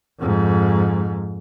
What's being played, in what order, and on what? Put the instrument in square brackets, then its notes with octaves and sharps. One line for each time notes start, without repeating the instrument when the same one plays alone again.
[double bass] F2 G#2